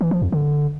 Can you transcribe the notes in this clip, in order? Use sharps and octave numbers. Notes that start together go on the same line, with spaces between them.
E3
F3
F2
D3